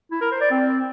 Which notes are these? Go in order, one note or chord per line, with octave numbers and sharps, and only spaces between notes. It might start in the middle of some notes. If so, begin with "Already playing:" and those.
E4
A#4
C5
D5
C4